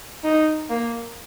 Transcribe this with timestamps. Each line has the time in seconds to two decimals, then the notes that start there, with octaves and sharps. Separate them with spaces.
0.24 D#4
0.70 A#3